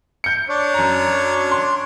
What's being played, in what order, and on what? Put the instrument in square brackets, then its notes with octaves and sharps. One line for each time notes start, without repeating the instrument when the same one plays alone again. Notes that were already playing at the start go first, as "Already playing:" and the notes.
[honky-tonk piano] G6 C#7
[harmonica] D4 C#5
[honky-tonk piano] F#2 A#5
C6